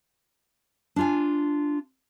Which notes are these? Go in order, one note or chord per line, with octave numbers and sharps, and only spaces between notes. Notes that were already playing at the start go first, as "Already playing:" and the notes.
D4 F4 G#5